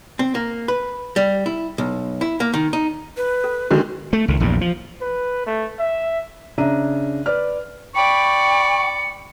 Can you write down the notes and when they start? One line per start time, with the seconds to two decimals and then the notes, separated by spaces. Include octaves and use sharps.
0.19 C4
0.35 A#3
0.68 B4
1.16 G3
1.46 E4
1.78 B1
2.21 E4
2.40 A#3
2.54 D#3
2.73 D#4
3.17 B4
3.44 A4
3.71 D3 D#3 G#3 F#4
4.13 A3
4.28 C#2 D#3
4.40 A#1 E2 G2
4.61 F3
5.01 B4
5.47 A3
5.79 E5
6.58 C#3 D4 E5 A#5 D#7
7.26 B4 D5 F6
7.95 D5 G5 B5 C#6 C#7